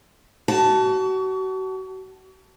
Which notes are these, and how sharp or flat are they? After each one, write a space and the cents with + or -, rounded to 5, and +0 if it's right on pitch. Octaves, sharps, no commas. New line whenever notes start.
F#4 +35 A5 +0